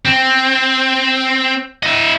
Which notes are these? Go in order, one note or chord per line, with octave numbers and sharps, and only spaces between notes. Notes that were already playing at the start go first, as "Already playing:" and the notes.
C4
E4 D#5